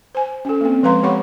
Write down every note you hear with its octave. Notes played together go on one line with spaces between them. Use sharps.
C5 G#5
C#4 A4
A#3 C4
F3 G#3 B4 F5 A#5 C6
B3 G4 C#5 F#5 B5 C#6